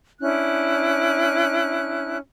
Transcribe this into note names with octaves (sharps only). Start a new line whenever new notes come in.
C#4 D4 E4 F#6